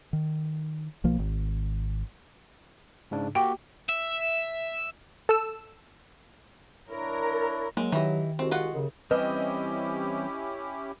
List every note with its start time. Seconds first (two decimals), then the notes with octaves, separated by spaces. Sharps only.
0.13 D#3
1.04 B1 F3 A#3
1.19 G#1
3.11 G#2 C#3 D4
3.35 A#3 F#4 G4 G5
3.89 E5
5.29 A4 E6
6.89 D4 E4 A#4 C#5
7.77 F#3 G#3 A#3
7.92 D#3 E3 G4 D#5
8.39 C2 G#3 C4 F#4
8.51 F4 D#5 F#5
8.74 F#2 C#3
9.11 E3 G3 C4 C#4 E4 G4 B4 D#5